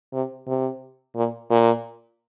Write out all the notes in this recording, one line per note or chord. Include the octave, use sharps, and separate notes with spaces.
C3
C3
A#2
A#2